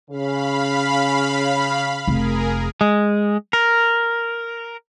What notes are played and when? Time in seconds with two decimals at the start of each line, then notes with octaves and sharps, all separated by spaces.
0.11 C#3 F5 B5
2.07 F1 G#4 A#4
2.81 G#3
3.53 A#4